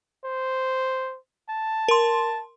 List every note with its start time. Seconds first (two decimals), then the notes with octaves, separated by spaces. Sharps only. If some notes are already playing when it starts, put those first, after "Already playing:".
0.25 C5
1.49 A5
1.88 A#4 C6